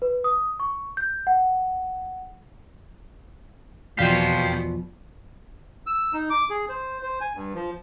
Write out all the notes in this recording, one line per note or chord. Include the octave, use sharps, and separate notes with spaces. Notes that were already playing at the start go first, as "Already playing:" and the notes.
B4
D#6
C#6
G6
F#5
E2 B2 F3 B3 G4 C5 F5 G5
E6
D#4
D6
G#4
C5
C5
G#5
G2
F3